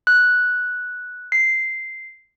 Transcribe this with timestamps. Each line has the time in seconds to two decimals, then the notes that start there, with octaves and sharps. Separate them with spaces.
0.07 F#6
1.32 C7